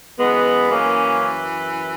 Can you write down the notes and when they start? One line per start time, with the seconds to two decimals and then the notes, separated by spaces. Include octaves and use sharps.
0.18 F#2 E3 G#3 B3
0.70 A#3 C#4